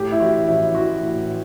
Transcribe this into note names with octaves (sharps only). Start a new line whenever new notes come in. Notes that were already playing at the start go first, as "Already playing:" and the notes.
Already playing: A2 G4
E4
A1 F#4
A1 E4
E3 F#4
A2